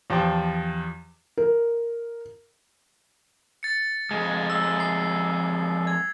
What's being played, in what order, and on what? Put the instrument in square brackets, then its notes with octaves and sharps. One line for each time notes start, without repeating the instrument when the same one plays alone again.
[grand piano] E2 F3 G4 C5 G5 A5
[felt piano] A#4
[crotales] A6 C#7
[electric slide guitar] F2 G#3
[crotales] E6
C7
G#6